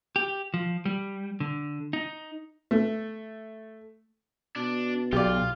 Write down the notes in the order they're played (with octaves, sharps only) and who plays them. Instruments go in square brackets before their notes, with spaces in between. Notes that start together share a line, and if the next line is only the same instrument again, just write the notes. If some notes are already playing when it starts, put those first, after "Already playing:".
[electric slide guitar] G4
F3
G3
D3
D#4
[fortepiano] A3
[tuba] B2 [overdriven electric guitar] D4
[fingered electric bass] B1 [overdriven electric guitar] F4 [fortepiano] G4 D5